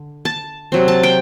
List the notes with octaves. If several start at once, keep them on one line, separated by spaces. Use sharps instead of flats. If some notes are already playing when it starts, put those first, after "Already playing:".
Already playing: D3
A5
C3 F#3 C4
A5
G5